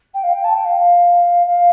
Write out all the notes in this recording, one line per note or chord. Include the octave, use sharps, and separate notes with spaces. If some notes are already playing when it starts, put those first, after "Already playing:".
G5
F5
G5
A5
G5
F5
F5